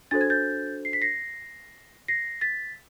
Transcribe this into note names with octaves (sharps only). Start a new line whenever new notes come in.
D4 F#4 A4 C5 A6
G#6
G6 A6
C7
B6
A#6 C7
A#6 C7
A6 B6